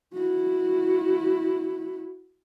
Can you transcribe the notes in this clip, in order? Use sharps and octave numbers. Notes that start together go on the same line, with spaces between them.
E4 F#4